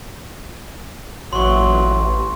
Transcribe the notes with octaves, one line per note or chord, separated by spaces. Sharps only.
A1 A#2 E3 F#3 C6 C#6